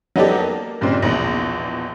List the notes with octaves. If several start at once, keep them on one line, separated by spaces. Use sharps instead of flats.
F#3 B3 D#4 G4 A4 D5
A#3
G2 A#2 C#3 G#3 C4
A#1 E2 B2